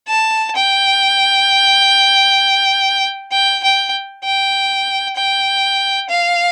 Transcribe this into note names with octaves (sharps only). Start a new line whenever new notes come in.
A5
G5
G5
G5
G5
G5
F5